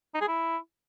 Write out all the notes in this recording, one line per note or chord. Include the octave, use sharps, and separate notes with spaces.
D#4
G#4
E4